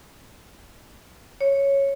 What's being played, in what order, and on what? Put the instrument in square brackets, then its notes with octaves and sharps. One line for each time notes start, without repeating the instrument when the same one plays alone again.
[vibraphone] C#5